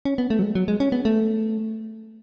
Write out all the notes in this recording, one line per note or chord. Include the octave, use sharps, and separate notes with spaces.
C#4
B3
A3
F#3
G#3
F#3
G#3
C#4
B3
A3